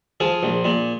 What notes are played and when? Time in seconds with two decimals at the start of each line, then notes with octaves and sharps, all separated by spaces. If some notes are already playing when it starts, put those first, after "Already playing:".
0.20 F3 G#4
0.43 A#1
0.64 A#2